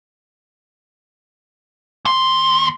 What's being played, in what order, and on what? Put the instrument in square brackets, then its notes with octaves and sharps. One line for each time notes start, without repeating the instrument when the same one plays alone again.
[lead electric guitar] D#2 C6